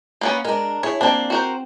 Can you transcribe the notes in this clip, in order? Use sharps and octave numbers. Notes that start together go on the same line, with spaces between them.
A#3 B3 C#4
G#3 D4 A#4
E4 G#4 C#5
A#3 C4 D4
F#4 A#4 C5